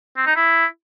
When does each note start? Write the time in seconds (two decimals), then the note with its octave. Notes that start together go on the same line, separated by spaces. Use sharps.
0.17 C4
0.27 D#4
0.36 E4